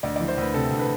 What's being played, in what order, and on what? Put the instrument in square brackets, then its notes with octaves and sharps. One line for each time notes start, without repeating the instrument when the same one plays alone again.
[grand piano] D2 D5
E3 D5
C5
D2 B4
C3 A4
D2
B4